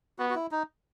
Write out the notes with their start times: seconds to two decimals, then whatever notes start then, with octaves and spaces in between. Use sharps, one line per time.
0.19 B3 F#4
0.30 F#4
0.35 E4
0.51 D#4